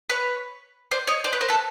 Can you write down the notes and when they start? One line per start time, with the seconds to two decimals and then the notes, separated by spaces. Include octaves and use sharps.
0.10 B4 C#5
0.91 C5 D5
1.07 C#5 D#5
1.24 C5 D5
1.33 B4 C#5
1.41 A#4 C5
1.49 A4 B4